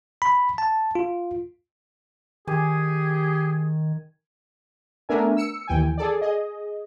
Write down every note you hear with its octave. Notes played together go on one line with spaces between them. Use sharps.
B5
A5
F4
D#3 G4 G#4 G#5
A3 B3 D4 A#4 E5 G#5
E6 C#7
D#2 E3 G5 G#5
G#4 A4 D5
G#4 D#5